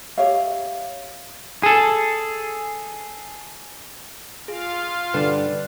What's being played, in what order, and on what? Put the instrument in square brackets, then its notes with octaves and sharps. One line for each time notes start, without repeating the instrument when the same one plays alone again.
[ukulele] G4 C#5 E5 F5
[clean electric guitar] G#4 A4
[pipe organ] F4 F5 [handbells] G#4
[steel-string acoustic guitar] G2 D3 G3 [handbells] B4 D5